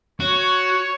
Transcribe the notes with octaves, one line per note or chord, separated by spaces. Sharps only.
F#4 C#5